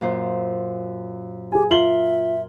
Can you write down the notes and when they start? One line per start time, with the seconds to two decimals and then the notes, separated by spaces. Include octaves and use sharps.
0.01 F#2 A#2 C5
1.52 G4 G#4 G#5
1.70 F4 A#4 E5 C6 F#7 G7